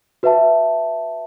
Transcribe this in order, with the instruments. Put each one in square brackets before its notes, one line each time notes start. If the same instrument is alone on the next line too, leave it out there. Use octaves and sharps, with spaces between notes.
[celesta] F#4 B4 E5 A5